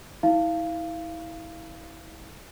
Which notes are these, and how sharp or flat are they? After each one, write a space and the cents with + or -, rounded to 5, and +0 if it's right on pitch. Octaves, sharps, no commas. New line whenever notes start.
E4 -30 F5 -20